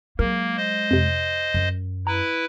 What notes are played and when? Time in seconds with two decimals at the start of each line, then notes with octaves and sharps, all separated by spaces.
0.19 F#3 G#3 A#3 A#4
0.57 C5 D#5
0.91 F2 C3
1.54 F#2
2.07 E4 B4 A#5